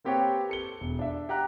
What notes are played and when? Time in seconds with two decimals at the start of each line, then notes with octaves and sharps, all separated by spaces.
0.04 A#3 C4 G4 B4 C#5 G5
0.49 A4 C#7 G7
0.81 E1
0.99 D4 E5
1.29 G4 F#5 A#5 F#6